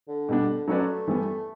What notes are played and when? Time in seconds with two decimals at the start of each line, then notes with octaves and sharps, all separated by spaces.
0.08 D3
0.29 B2 G3 D4
0.68 F#3 A3 C#4 F#4 B4 D5
1.08 E3 G3 B3